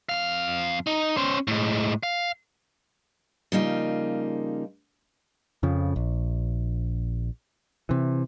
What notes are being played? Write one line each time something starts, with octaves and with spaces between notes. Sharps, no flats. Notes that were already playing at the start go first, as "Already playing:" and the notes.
F2 F5
D#4
C#4 C5
A2 G#3
F5
C#3 F3 G3 A#3 D#4 F4
F2 C#3 F3
A#1
C3 E3